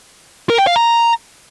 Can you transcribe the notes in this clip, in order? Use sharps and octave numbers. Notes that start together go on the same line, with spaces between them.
A#4
G5
F5
A#5